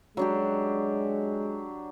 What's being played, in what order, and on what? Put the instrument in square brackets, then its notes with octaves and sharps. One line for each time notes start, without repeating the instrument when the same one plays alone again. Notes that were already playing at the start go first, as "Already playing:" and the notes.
[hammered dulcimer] F#3 D4 G4 [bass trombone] G#3